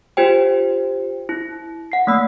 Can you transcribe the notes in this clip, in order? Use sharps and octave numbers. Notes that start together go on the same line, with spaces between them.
F4 G4 C5 G5
E4
F#5 C7
A3 A#3 E6